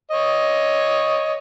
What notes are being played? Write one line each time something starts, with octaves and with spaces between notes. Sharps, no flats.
C#5 D#5